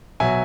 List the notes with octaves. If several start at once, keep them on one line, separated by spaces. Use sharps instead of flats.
B2 F#3 E5 G#5